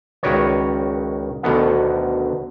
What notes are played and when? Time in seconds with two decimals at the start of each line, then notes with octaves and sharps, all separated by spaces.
0.23 C#2 D#3 F#4 B4 C#5 D5
1.43 D2 B2 D3 D#3 B3 F#5